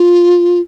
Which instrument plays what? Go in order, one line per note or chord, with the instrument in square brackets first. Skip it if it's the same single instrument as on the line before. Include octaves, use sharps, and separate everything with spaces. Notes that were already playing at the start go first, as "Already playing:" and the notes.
Already playing: [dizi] F4